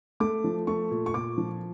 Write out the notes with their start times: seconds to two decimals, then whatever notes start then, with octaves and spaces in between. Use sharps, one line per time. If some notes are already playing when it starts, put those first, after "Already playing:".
0.20 A3 D6
0.44 F3
0.67 A3 C#6
0.91 A#2
1.06 C#6
1.14 A#2 D6
1.38 F3